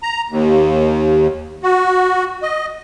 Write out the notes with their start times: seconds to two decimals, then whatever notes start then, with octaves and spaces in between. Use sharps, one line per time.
0.03 A#5
0.30 D#2
1.63 F#4
2.42 D#5